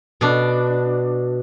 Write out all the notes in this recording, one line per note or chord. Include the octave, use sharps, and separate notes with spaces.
B2 D4